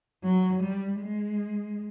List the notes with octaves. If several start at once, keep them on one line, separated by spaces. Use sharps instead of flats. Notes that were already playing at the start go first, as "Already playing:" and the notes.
F#3
G3
G#3